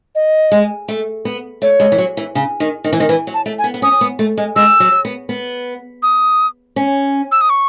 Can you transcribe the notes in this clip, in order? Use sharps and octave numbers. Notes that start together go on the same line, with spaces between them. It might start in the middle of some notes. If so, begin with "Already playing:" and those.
D#5
G#3
A3
B3
A3 C#5
G#3
E3
F#3
E3
C#3
D#3
D#3
E3
D#3
E3 B4
F#3
A5
A3
G#5
B3
B3
C#4 D#6
B3
A3
G#3
G#3 E6
F#3
B3
B3
D#6
C#4
E6
D#6
C#6